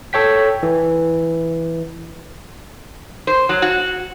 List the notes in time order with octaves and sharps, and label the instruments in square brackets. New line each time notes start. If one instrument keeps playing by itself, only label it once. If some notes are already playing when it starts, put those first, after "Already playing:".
[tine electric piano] A4 C#5 G5 B6
E3
[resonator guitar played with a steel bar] C5
F#3
F#4